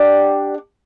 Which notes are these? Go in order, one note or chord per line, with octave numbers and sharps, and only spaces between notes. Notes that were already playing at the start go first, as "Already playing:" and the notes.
Already playing: D4 G4 D5 F#5